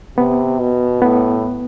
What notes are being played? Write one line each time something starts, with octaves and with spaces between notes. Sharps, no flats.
C3 B3
B2
A2 B3